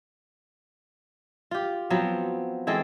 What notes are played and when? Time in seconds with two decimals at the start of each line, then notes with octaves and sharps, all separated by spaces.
1.51 F4 G4
1.90 F3 F#3 B3 C4
2.67 E3 G#3 C4 A4